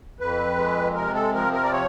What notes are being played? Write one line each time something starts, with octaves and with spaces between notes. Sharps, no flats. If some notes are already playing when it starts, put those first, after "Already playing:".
F2 B4
G#3
C3 A#4
A4
F3 A#4
A#4
D5
C#5